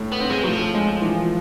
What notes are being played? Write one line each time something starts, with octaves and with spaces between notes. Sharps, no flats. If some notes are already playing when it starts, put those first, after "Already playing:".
Already playing: A2
B3
C4
G#3
F#3
A2 F3
G#3
E3